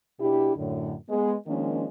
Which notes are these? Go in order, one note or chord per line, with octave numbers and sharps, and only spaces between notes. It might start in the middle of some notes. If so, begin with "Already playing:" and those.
B2 D4 E4 G4
F#2 A2 D3
G#3 B3
D#3 F3 G#3 A#3 C#4 D4